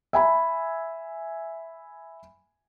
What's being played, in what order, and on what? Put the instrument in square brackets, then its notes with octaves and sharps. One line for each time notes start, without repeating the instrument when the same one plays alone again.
[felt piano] E5 G#5 B5